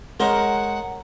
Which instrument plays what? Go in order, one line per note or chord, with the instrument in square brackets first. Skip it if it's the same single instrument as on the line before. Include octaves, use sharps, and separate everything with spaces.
[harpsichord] G#3 C5 [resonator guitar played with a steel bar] A#4 C#5 [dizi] F#5